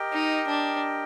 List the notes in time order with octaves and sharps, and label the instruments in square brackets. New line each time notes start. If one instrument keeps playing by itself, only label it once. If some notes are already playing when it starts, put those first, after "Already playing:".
Already playing: [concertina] G4 A#4 D#5 G5
[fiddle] D#4
D4